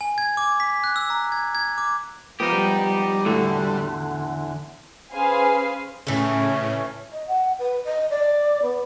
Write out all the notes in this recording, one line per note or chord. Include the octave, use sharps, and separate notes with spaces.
G#5
G#6
D6
B6
F#6
E6
A#5
G#6
G#6
D6
F3 B3 D#4 G4 D#6 F6
G3 G5
E2 A2 D3 A3 F#4
C#4 G#4 B4 C5 F5 G#5
A2 C#3 E3 A3 C#4
D#5
F#5
B4
D#5
D5
B3